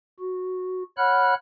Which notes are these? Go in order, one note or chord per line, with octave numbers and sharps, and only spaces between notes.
F#4
C#5 F#5 B5 F6 F#6